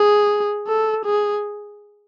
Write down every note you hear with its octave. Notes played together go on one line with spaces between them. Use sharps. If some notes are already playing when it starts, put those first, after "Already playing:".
Already playing: G#4
A4
G#4